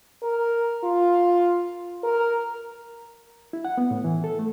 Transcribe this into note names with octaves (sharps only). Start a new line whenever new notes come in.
A#4
F4
A#4
E4
F#5
B3
A2
E3
A4
A3